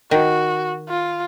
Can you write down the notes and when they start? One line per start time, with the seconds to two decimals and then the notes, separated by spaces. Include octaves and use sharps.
0.11 D#3 F#4
0.89 F4